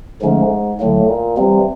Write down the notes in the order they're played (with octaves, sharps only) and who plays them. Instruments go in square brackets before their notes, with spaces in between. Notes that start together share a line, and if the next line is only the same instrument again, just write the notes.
[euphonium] G#2 [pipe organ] D3 F3 A3 C#4
[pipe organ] D2 D3 F#3 A#3 [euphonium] A2
[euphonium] A#2
[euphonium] C3 [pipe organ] E3 G3 A#3